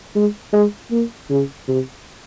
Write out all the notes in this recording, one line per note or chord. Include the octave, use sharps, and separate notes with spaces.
G#3
G#3
A#3
C#3
C3